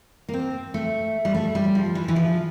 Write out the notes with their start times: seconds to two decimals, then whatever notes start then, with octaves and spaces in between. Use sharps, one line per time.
0.28 A#3
0.33 C4
0.74 A3
1.25 G3
1.34 A3
1.55 G3
1.75 F3
1.95 E3
2.08 E3
2.16 F3